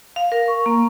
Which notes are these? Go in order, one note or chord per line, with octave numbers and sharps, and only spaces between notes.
F5
A#4
C#6
A#3